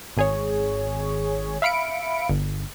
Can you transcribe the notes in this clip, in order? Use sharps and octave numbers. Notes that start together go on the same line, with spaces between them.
G#1 G#4 C#5
E5 F5 B5 C#7 D7
G1